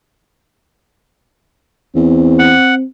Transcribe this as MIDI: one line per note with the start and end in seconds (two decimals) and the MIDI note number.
1.95 2.54 40
1.95 2.84 60
2.39 2.75 78